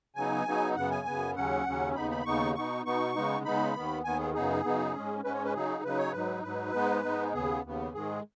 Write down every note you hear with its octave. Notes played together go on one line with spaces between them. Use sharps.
C#3 F#3 B3 D#4 G#5
C#3 F#3 B3 D#4
F#2 C#3 B3 F#5
G#5
F#2 C#3 B3
D#2 C#3 F#3 C#4 F#5
D#2 C#3 F#3 C#4
D#2 C#3 B3 D#4 B5
B5
D#2 C#3 B3 D#4 C#6
B2 B3 D#4 C#6
B2 B3 D#4 C#6
C#3 G#3 B3 D#4
C#3 G#3 B3 D#4 B5
D#2 D#3 B3
D#2 D#3 B3 G#5
G#4
F#2 C#3 B3 D#4 G#4
F#2 C#3 B3 D#4
G#2 G#3 C#4
G#2 G#3 C#4 B4
C#5
B4
C#3 F#3 D#4 G#4
C#3 F#3 D#4 B4
C#5
G#2 F#3 D#4 B4
G#2 F#3 D#4 B4
G#2 G#3 B3 D#4
G#2 G#3 B3 D#4
D#2 C#3 B3 G#4
D#2 C#3 B3
G#2 D#3 G#3 G#4